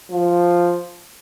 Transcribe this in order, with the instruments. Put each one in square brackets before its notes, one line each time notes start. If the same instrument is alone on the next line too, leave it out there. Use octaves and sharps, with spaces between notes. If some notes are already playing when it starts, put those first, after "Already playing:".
[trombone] F3